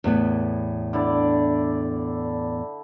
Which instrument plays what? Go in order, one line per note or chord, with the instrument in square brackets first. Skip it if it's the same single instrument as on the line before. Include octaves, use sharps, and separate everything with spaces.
[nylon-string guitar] E2 A2 B3
[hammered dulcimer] D3 E4 D5